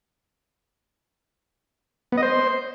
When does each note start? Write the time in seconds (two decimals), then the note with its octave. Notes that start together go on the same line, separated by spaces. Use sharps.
2.12 B3
2.17 D#5
2.23 C5